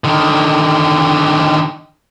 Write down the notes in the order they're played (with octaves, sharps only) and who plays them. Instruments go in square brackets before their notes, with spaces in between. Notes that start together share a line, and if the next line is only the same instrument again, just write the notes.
[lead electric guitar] D3 D#3